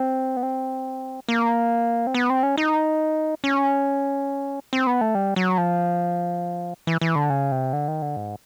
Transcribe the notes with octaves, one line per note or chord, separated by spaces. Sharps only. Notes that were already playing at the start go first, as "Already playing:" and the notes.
Already playing: C4
B3
C4
A#3
C4
B3
C4
C#4
D#4
C#4
C4
B3
A3
G3
F#3
F3
E3
E3
D3
C#3
C3
D3
D#3
D3
G#2